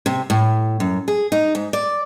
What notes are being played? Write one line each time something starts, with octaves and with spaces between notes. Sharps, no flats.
C3
A2
F#2
G#4
D#4
G#2
D5